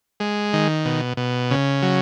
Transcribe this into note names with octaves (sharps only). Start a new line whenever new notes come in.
G#3
D#3
B2
B2
C#3
F#3